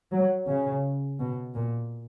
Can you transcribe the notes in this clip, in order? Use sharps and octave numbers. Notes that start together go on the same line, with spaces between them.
F#3
C#3
B2
A#2